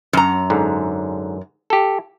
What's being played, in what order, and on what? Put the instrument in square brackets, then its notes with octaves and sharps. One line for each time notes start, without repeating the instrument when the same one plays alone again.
[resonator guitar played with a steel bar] F#2 A#5
[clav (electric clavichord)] G#2 D3
G4 A4